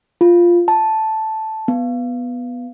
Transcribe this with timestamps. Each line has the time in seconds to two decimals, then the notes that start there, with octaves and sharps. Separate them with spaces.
0.21 F4
0.68 A5
1.68 B3